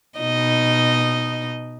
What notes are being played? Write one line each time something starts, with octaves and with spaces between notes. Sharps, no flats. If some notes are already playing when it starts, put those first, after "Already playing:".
B2 D#4 D#5